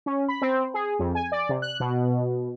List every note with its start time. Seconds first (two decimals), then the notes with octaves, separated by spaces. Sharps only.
0.06 C#4
0.28 B5
0.42 C4
0.74 G#4
0.99 F2
1.15 G#5
1.32 D5
1.49 C3
1.62 F#6
1.80 B2